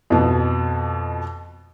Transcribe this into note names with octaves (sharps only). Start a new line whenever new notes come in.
F2 B2